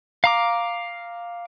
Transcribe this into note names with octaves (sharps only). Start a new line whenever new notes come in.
F5 A#5 D6